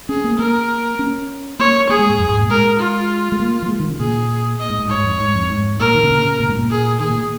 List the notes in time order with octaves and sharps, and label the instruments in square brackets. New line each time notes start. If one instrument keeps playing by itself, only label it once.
[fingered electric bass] C#4 [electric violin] G#4
[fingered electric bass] A#3
[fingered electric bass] A#3 [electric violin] A#4
[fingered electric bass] C#4
[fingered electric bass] A#3 [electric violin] C#5
[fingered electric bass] A#3 [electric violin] G#4
[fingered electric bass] G#3
G#2
F2
G#2
A#2
[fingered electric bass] G#3 [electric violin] A#4
[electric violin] F4
[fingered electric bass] G#3
A#3
F3
G#3
D#3
C#3
[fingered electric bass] A#2 [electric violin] G#4
[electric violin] D#5
[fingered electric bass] G#2
G#2
[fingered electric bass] G#2 [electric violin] C#5
[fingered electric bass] F2
G#2
F2
G#2
[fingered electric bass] A#2 [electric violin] A#4
[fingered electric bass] D#3
C#3
A#2
C#3
A#2
G#2
A#2
[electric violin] G#4
[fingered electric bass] D#3 [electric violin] G#4
[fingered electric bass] A#2